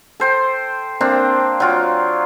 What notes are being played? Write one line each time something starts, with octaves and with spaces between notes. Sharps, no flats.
A4 C5 G5
A#3 C4 D4
F#3 F4 G5